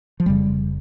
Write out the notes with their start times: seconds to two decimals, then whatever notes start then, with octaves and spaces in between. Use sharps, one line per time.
0.20 F3
0.26 F1 F2 C#3 G3